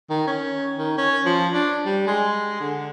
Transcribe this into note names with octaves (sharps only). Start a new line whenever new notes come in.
D#3
C#4
D#3
C#4
F3
D4
G3
G#3
D3